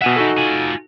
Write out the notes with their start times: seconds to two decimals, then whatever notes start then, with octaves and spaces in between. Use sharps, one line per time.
0.02 B2 E5 F#5 G#5
0.16 D#4 F#4 A4
0.37 F4 G#5